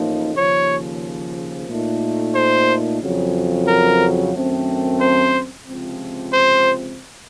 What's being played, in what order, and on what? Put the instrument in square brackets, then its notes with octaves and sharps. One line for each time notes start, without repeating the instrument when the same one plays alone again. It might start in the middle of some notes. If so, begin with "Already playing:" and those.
Already playing: [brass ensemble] A1 A2 F3 A#3 D#4
[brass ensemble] D#2 C#3 F3 [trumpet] C#5
[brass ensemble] A#2 A3 D#4
[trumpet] C5
[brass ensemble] F2 C#3 F#3
[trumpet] A#4
[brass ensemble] F#2 D#3 A3 C4
[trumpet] C5
[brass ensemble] C#2 C3 F3 C4
[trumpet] C5